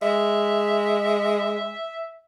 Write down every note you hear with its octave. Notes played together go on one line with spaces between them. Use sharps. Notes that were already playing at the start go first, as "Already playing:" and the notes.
G#3 E5